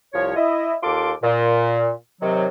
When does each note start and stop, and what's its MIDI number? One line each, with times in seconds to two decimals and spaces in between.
0.14 0.34 36
0.14 0.34 53
0.14 0.34 73
0.36 0.74 64
0.36 0.74 75
0.83 1.12 39
0.83 1.12 65
0.83 1.12 69
0.83 1.12 84
0.83 1.12 86
1.23 1.91 46
2.22 2.47 48
2.22 2.47 51
2.22 2.47 54